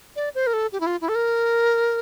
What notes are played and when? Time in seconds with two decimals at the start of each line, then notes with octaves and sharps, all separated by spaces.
0.16 D5
0.35 C5
0.47 A#4
0.53 A4
0.72 G4
0.80 E4
0.87 F4
1.01 E4
1.09 A4
1.15 A#4